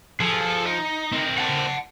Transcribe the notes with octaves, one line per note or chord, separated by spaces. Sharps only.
F3 G#4 A4
D#4
C4 A#4
F#5 A5